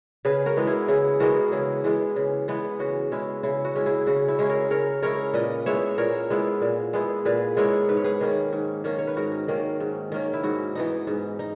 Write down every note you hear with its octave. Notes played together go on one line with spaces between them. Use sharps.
C#3 G#4 B4
F#4 A#4
E3 G#3 B3
E4 G#4
C#3 E4 G#4
E3 G#3 B3 F#4 A#4
C#3 E4 G#4
E3 G#3 B3
C#3
E3 G#3 B3
C#3 F#4
G#3 C#4 E4
C#3 E4
F#4
G#3 C#4 E4
E4 G#4
C#3 F#4
E4
G#3 C#4 E4
A#4 C#5
C#3 A#4 C#5
G#3 C#4 E4 A#4 C#5
A#2 B4 D#5
G#3 B3 E4 C#5 E5
A#2 A#4 C#5
G#3 B3 E4
A#2
G#3 B3 E4
A#2 G#4 B4
G#3 B3 E4 A#4 C#5
G#2 B4
C#5
G#4 B4
D#3 A#3 C#4
G#2
D#3 A#3 C#4
C#5
B4
G#2 F#4 A#4
D#3 A#3 C#4
G#2
D#3 A#3 C#4
E4
G#2 F#4
E3 B3 D#4
G#2
D#4